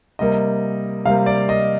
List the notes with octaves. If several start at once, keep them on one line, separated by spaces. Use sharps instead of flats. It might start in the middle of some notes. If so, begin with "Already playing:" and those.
C3 G3 A#3 D#5
C3 G3 A#3 F5
D5
D#5